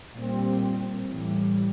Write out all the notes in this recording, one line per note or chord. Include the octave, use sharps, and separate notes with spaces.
A#2 G3 C4
A2 E3 G3